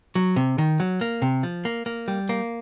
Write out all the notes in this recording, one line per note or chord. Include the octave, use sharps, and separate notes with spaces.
F#3
C3
D#3
F#3
A#3
C3
F3
A#3
A#3
G3
A#3